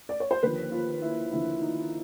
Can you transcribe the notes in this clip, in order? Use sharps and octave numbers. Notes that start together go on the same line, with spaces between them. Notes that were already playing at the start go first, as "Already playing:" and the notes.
D5
C#5
C5
D#2 D3 F3 B4
F4
E4
D#2 D3 F3 E4
D#4